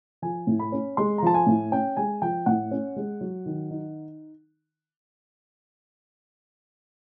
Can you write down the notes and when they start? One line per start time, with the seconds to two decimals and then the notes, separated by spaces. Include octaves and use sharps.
0.22 F3 G#5
0.47 A2
0.59 B5
0.72 C#4
0.97 G#3 C6
1.18 A#5
1.22 F3 A5
1.34 G#5
1.47 A2
1.72 C#4 G5
1.97 G#3 G#5
2.22 F3 G5
2.46 A2 F#5
2.71 C#4
2.96 G#3
3.21 F#3
3.46 D#3
3.71 D#4